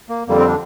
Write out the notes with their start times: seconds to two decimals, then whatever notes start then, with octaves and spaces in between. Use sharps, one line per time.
0.09 A#3
0.27 F2 D3 G3 A#3
0.37 C4
0.47 D4